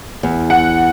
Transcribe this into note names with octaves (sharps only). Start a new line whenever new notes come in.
E2
F#5